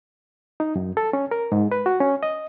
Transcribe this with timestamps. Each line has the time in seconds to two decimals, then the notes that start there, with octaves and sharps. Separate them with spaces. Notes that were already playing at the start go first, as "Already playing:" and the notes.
0.60 D#4
0.76 F#2
0.97 A4
1.13 C#4
1.31 A#4
1.52 G#2
1.72 B4
1.86 F#4
2.01 C#4
2.23 D#5